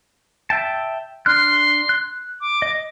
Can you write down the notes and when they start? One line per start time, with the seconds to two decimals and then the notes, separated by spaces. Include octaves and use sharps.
0.50 E5 G5 A5
1.26 D4 C6 F6 F#6
1.89 F#6
2.41 D6
2.62 D#5